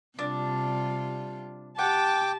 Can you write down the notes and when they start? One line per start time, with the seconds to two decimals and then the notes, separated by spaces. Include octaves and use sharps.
0.19 C3 G3 D4 F4
1.79 G4 F#5 G5 A5 D6